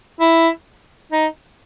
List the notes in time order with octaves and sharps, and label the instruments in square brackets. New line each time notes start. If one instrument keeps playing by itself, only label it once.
[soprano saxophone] E4
D#4